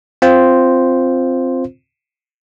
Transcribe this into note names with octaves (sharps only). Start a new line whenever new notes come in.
C4 F4 C5